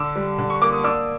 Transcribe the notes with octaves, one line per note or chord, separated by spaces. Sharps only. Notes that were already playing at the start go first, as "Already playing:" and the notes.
Already playing: D3 D6 E6
G3
D3
C#6
A#3 D6
D#6
D4 D6 E6